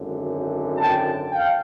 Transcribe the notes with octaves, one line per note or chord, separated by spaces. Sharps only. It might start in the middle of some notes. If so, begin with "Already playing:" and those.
Already playing: G#1 F#2 D3
G5 A5
F5 G5